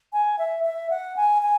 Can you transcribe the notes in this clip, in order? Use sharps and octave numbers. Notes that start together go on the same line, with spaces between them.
G#5
E5
E5
F#5
G#5
G#5